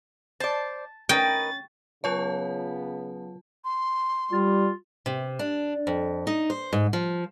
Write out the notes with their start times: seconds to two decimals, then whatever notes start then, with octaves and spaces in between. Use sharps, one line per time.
0.40 C5 D5 A5
1.09 C#4 D#4 A#4 B4 G5 A6
2.04 C#3 F#3 B3 F4 C#5 A5
3.65 C6
4.32 G3 F4
5.06 C3
5.39 D4
5.87 F2
6.27 D#4
6.50 C5
6.73 G#2
6.93 F3